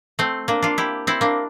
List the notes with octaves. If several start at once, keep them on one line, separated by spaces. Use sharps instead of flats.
A3 C4
A#3 D4
D4 F4
E4 G4
C4 E4
A#3 D4